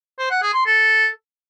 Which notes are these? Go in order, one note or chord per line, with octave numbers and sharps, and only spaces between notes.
C5
F#5
G#4
C6
A4